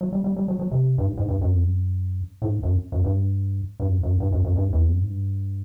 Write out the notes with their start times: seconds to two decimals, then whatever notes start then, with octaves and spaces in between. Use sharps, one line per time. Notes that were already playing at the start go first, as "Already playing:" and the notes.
0.01 F#3
0.13 G3
0.24 G3
0.37 G3
0.48 F#3
0.59 F#3
0.72 C3
0.98 G2
1.05 G#2
1.18 G#2
1.29 G2
1.41 F#2
1.52 F2
1.64 F#2
2.42 A2
2.46 G#2
2.63 F#2
2.92 F#2
3.04 G2
3.80 G2
3.86 F#2
4.03 F#2
4.20 G2
4.32 F#2
4.45 F#2
4.56 G2
4.73 E2
4.86 F2
4.91 F#2
5.01 G#2
5.09 G2